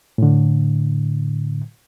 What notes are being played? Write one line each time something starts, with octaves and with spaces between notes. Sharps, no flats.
A2 D3